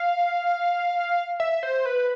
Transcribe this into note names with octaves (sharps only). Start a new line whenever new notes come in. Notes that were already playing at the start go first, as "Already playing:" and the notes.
Already playing: F5
E5
C5
B4